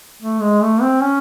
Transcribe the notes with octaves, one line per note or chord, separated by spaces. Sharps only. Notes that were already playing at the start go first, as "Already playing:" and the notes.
A3
G#3
A3
C4
C#4